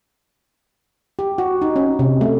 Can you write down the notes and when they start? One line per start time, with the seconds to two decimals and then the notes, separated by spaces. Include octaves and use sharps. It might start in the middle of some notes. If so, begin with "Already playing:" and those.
1.19 G4
1.38 F#4
1.62 D#4
1.76 C#4
1.99 C3
2.21 A3